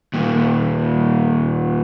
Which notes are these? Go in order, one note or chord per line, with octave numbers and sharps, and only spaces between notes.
D#2 A#2